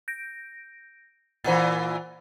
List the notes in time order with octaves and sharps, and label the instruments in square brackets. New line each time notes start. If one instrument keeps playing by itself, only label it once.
[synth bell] G6 A#6 D7
[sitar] A#2 E3 [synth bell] C5 F#5 A6